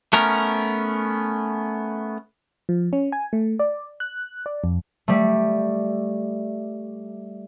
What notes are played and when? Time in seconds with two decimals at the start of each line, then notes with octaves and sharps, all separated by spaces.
0.13 A3 B3 C#4 A#4
2.69 F3
2.93 C#4
3.12 G#5
3.33 A3
3.59 D5
4.00 F#6
4.46 D5
4.64 F2
5.08 G3 A3